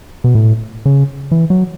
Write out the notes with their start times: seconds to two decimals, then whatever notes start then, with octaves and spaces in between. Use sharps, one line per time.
0.24 B2
0.35 A2
0.85 C#3
1.31 E3
1.50 F#3